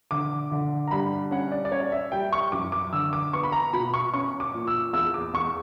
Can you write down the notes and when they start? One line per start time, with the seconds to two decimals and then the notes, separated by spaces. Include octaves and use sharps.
0.11 D3 D6
0.51 D3
0.88 A#5
0.91 G2 B5
1.31 C#4 F#5
1.52 D5
1.65 D5
1.72 C#4 C#5
1.92 E5
2.12 G3 G5
2.33 C#6
2.52 F#2 D6
2.72 D6
2.93 D3 E6
3.13 D6
3.33 B3 C#6
3.43 B5
3.52 A#5
3.73 B2 B5
3.94 C#6
4.13 C#4 C#6
4.40 D6
4.54 A#2
4.67 E6
4.93 E2 E6
5.14 D6
5.34 E2 C#6